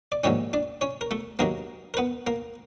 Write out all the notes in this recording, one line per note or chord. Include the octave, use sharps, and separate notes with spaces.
D5
A#1 G#2 D#3 G3 C#4 C#5
D4 D5
C#4 C#5
A#4
A3 A4
G2 D#3 F#3 A#3 A#4
A#4
B3 B4
A#3 A#4